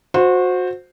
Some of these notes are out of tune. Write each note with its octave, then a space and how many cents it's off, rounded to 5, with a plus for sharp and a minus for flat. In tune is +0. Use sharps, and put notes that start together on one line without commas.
F#4 -25 C5 +0